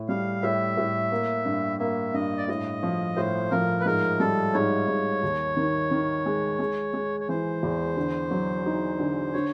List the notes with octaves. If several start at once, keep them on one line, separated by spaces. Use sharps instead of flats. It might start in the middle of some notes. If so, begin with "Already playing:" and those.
Already playing: A2
G3 F5
A2 E5
A2
A#3
G2
A#3 E5
G2 D#5
D5
A2 D#5
F3
A2 C5
F3 A#4
B4
G#2 A#4
G3 A4
G#2 C#5
G#2
D#2
D#3
D#3
G#3
G#3
G#3
C#5
E3 C5
E2
D3
F#3
D#4
D3
D3 C#5